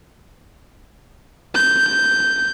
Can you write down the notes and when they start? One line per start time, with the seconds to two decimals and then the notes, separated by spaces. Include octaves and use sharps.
1.55 G6